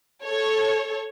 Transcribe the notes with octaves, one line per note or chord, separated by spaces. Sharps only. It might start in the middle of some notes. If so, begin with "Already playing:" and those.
A4 C#5